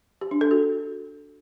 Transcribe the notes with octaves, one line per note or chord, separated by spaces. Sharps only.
G4
D4
A4
F#4